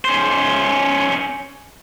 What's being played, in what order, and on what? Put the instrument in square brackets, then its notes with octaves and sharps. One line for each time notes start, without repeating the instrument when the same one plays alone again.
[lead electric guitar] C#4 C5